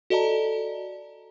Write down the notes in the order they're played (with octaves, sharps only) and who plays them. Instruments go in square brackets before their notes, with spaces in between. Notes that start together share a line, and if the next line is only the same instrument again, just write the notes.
[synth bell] F#4 A4 D5 D#5 A5 A#5